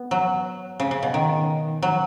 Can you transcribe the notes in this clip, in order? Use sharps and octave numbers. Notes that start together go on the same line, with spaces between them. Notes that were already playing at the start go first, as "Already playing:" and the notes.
Already playing: B3
F#3
C#3
C#3
B2
D#3
F#3